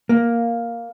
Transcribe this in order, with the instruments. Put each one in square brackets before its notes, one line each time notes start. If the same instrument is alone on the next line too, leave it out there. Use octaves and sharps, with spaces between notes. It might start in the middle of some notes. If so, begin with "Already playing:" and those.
[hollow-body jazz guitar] A#3